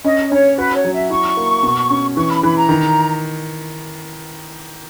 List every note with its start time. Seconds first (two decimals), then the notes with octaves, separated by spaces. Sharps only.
0.05 C#4 D#5
0.31 C#4 C#5
0.58 F#4 B4
0.75 C#5
0.84 F#3
0.93 E5
1.10 E4 C#6
1.37 A#3
1.63 B2
1.90 C#4
2.16 E3 C#6
2.29 B5
2.43 E3 B5
2.56 A#5
2.69 D#3